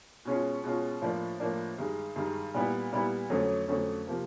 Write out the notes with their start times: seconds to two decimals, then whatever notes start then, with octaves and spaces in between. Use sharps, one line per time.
0.25 B2 G#3 C#4 F4
0.64 B2 G#3 C#4 F4
1.01 A2 F3 A#3 D4
1.40 A2 F3 A#3 D4
1.78 G2 D#3 G#3
2.16 G2 D#3 G#3
2.54 A#2 G3 B3 E4
2.92 A#2 G3 B3 E4
3.30 F2 D3 F#3 A3 C#4
3.68 F2 D3 F#3 A3 C#4
4.07 C3 F3 A#3